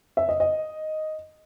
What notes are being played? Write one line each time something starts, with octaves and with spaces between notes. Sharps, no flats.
E5
D#5
D#5